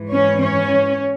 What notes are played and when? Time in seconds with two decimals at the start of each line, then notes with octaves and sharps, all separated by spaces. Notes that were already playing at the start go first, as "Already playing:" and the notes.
Already playing: G#2 E3
0.11 C#4 C#5
0.40 C#4 C#5